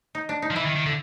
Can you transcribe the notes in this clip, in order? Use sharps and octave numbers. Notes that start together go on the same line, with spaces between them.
D#4
D4
D#4
F3
E3 E4
D#3
D#3
D3